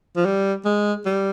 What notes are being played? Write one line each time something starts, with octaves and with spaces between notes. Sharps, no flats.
F3
G3
G#3
G3